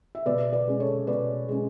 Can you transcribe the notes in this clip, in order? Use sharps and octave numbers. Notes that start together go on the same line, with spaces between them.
E5
B2 B4 D5
B4 D5
G#3 C#4
A4 C#5
B2 B4 D5
G#3 C#4